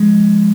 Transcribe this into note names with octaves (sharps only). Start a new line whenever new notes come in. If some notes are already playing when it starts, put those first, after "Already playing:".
Already playing: F3 G#3